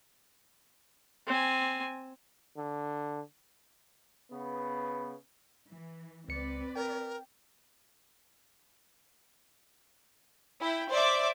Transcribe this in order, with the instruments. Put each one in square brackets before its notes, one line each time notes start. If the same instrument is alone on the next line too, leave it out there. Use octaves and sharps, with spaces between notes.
[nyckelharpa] C4 G#5
[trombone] D3
[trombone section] C#3 B3
[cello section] E3
[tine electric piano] C#2 C#7 [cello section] C4 B4 D5
[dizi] A#4 [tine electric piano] G5
[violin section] E4 G5
C5 D5 E5 D6